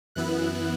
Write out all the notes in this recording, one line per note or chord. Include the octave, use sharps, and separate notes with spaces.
F#2 E3 B3 E4 F#6